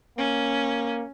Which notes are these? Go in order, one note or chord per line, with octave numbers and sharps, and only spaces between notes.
A#3 C#4